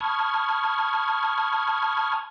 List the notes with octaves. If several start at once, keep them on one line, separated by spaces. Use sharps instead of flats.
A5 B5 C#6 D#6 F6 G#6